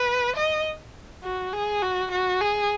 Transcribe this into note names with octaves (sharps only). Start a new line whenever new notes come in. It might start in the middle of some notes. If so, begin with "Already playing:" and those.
Already playing: B4
D#5
F#4
G#4
F#4
F#4
G#4